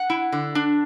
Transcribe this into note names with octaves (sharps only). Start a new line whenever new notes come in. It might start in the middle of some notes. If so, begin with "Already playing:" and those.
Already playing: F#5
E4
D3
D4